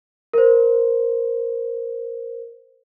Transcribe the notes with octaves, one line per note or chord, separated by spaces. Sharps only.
A#4 C5